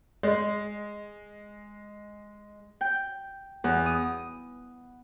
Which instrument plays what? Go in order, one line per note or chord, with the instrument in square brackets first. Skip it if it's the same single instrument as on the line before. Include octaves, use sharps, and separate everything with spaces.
[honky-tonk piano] G#3 [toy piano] D#5 C6
[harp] G5
E2
D#6